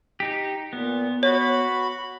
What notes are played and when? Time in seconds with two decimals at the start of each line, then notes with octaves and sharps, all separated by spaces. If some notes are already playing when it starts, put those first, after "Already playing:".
0.20 D#4 G4
0.73 A#2 B3
1.23 F#4 C#5 B5